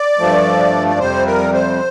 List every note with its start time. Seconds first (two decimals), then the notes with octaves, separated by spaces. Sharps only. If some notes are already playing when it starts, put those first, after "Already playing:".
Already playing: D5
0.19 G2 F3 A3
0.90 D5
0.99 F2 C3 G3 C5
1.26 A#4
1.53 C5